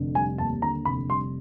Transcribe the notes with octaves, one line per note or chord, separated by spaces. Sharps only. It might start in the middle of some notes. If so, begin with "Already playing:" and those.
Already playing: F1 D3
G3 G#5
D#2 A5
D3 A#5
F1 B5
G3 C6